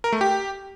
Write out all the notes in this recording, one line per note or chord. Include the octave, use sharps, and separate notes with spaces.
A#4
A3
G4